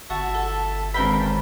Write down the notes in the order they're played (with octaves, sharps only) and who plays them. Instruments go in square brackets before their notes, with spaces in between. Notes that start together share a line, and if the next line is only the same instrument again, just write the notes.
[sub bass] G1 [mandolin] F#4 [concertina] E5 A5
[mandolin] A4
[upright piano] G#1 B4 [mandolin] A#4 G5 B5 [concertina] E5 F5
[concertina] C#4 E4 A5